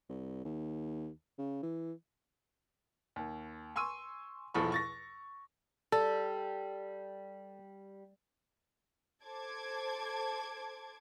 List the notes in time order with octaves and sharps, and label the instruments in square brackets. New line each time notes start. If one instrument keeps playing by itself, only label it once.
[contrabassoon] C2
D#2
C#3
E3
[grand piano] D#2
G#5 C6 C#6 E6 D#7
B1 E2 F3 A4 B5 C#6
C#6 A6 A#6
[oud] G3 [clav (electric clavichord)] A4
[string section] A4 C5 A5 D6 G#6